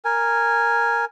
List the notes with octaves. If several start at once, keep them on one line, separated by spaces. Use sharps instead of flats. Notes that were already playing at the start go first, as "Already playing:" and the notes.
A#4 G#5